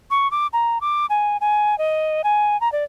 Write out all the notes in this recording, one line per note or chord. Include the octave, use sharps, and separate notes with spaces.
C#6
D6
A#5
D6
G#5
G#5
D#5
G#5
A#5
D5